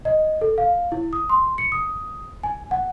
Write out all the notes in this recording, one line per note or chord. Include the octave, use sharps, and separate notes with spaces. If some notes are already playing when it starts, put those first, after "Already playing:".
D#5
A4
F5
E4
D#6
C6
C#7
D#6
G#5
F#5